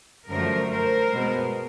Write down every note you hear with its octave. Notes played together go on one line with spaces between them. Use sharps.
F#2 D3 F3 A3 A#4 C5
A#4 C5
B2 G#3 B3